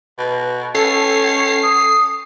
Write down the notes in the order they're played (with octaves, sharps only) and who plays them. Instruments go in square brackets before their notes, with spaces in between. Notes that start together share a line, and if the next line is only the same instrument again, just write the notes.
[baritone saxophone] B2
[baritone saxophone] C#4 [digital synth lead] A4 [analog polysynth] C7
[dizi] D#6